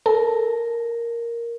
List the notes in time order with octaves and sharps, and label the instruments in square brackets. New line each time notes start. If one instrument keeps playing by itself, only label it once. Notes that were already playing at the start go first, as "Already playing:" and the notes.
[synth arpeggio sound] A4 [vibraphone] A#4